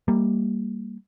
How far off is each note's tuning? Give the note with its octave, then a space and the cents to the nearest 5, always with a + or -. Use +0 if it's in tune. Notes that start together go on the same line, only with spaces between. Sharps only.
G3 +0 A#3 -15